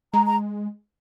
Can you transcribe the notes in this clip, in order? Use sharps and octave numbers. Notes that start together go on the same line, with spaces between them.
G#3 A#5
A#5